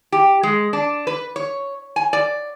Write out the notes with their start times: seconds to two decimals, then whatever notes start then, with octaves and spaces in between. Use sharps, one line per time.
0.12 G4
0.43 G#3
0.73 D4
1.07 B4
1.36 C#5
1.96 G#5
2.13 D5